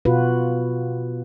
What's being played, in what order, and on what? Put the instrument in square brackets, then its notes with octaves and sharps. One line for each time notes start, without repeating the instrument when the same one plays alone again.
[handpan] B2 F4 F#4 B4